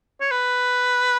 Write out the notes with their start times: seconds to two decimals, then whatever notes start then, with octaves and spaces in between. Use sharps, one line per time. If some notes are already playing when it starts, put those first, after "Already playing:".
0.21 C#5
0.31 B4